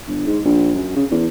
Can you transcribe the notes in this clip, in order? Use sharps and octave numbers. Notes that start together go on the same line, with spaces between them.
G1
G#2
A#1
F#2
C#3
E2